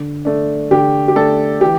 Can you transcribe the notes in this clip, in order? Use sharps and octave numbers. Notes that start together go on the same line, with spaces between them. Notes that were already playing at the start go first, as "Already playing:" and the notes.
Already playing: D3
A3 D4
D3 G4
G4
A3 D4 A4
E3 G4